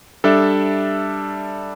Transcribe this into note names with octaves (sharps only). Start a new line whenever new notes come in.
G3 D4 A4 E5